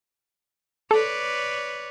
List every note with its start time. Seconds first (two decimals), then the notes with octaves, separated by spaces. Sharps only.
0.91 A4 B4 C#5 D5